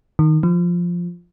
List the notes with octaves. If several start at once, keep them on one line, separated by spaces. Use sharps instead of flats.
D#3
F3